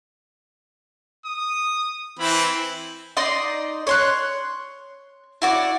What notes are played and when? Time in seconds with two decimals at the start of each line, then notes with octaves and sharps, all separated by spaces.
1.25 D#6
2.19 E3 C4 E4 B5
3.17 D#4 D5 D#5 C6
3.87 C#5 C6 F#6
5.42 E4 F#4 D5